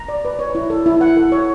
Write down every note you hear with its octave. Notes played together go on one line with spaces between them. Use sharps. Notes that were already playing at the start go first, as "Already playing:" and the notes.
Already playing: A#5
D5
B4
C#5
E4
A4
E4
F#5
A4
C#5